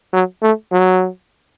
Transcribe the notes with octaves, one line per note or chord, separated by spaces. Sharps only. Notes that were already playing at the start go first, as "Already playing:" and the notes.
F#3
A3
F#3